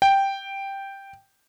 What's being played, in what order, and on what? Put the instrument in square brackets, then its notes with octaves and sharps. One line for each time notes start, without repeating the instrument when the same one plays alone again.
[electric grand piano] G5